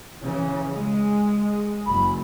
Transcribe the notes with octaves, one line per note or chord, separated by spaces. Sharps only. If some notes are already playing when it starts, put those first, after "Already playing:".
C#3 E3
G#3
F#1 B5